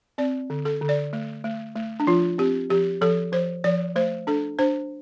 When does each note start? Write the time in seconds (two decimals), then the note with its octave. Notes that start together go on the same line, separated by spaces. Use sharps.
0.18 C4 D5
0.50 D3
0.65 A4
0.81 D3
0.89 D5
1.13 A3
1.44 A3
1.76 A3
2.00 D4
2.07 F3 F4
2.38 C4 G4
2.70 F3 G4
3.01 F3 A4
3.33 F3 C5
3.64 F3 D5
3.96 A3 C5
4.27 D4 A4
4.59 D4 C5